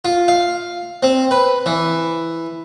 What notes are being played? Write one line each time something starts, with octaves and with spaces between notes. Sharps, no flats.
F4
F5
C4
B4
E3